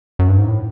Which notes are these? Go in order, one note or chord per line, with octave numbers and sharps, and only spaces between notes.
F#2
G2
G#2
A2